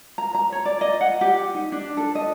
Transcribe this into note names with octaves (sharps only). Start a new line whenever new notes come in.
A#5
A#5
C#5
D5
D#5
F#5
G4
D#4
D4
A4
D#5